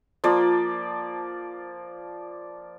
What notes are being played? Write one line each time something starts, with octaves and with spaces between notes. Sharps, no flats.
F3 A#3 D5